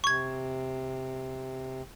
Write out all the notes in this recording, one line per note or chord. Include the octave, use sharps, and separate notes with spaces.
C3 C#6 G#6